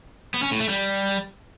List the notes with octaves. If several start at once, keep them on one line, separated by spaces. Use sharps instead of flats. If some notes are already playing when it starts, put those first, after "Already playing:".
B3
C#4
A2
A3
G3